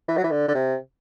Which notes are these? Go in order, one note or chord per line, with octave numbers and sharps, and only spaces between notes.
E3
F#3
E3
D3
D3
C3